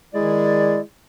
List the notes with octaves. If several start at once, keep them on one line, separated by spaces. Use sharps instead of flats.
D#3 G#3 E4 G#4 D5